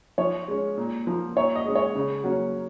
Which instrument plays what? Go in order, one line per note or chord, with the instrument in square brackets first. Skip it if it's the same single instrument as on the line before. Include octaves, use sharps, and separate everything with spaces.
[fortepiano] F3 C#5
G#3 C#4
A#2
F3 A#3
A#2 C#5
D#5
G#3 C#4
C#5
C#3
F#3 A#3 C#4